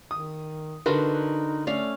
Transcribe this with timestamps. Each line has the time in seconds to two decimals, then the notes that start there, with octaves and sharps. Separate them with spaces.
0.11 D#3 D#6
0.86 D3 D4 D#4 F#4 A#4 B4 C6
1.67 A3 C#4 D5 F5